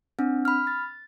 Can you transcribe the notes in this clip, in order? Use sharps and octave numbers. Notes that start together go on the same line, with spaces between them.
C4 D4
B5 F6
A6